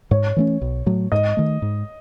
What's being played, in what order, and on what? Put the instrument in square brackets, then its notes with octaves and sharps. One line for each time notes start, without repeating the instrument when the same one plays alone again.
[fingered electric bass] G#2 [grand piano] C#5
[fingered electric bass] E3 A3 C#4
B1
A2 F#3
[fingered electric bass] G#2 [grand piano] D#5
[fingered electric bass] D#3 A3
G#2